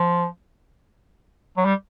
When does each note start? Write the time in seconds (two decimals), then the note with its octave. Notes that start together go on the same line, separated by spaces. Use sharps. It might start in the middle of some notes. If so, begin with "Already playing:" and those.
Already playing: F3
1.57 F#3
1.65 G3